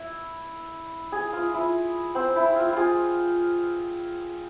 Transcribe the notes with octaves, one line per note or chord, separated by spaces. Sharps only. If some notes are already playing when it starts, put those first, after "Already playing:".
Already playing: E4
G#4
F4
E4
C4
E4
F4
F4 G#4